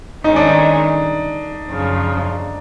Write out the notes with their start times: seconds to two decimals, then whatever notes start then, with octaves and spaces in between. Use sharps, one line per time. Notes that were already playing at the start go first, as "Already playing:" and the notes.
0.24 D#3 G#3 C#4 D#4
0.36 D4
0.47 D#4
1.69 F#2 C#3 F3